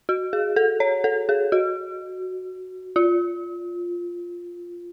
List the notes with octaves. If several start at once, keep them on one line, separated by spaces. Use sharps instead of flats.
F#4
G#4
A4
C#5
A4
G#4
F#4
F4